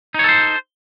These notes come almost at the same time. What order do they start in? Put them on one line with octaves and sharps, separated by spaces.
D#4 C#5 A4 C5